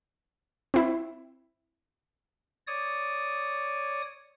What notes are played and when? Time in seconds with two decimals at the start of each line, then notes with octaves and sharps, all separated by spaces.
0.74 C4 E4
2.67 C#5 D5 D#6